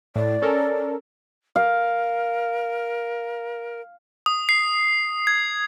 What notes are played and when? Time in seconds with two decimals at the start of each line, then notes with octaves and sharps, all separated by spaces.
0.16 A2 D5
0.42 C#4 A4 A#4
1.56 A#4 F5
4.26 D#6
4.49 C7
5.27 G#6